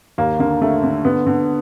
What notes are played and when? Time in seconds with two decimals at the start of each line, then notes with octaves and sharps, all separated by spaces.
0.18 D#2 A#3
0.39 D3 A#3
0.62 D3 A3
0.83 D3
1.05 D3 B3
1.27 D3